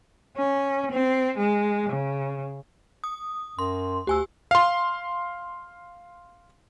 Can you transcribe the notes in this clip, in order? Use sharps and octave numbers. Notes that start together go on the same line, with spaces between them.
C#4
C4
G#3
C#3
D#6
F#2 C6
D2 G4 G#5 E6
F5 C6